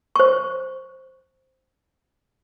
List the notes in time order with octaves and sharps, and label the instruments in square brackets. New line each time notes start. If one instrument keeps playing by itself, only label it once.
[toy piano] C5 C#6